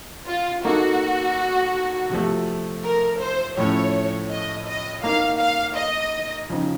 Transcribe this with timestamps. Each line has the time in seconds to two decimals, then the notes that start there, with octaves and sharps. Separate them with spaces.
0.27 F4
0.64 A#3 D#4 F#4 A4
2.10 C3 F3 A3
2.84 A#4
3.20 C5
3.57 A2 F3 A3 C#4 C#5
4.30 D#5
4.67 D#5
5.03 A#3 D#4 A#4 F5
5.39 F5
5.77 D#5
6.49 C#3 F3 C4 D#4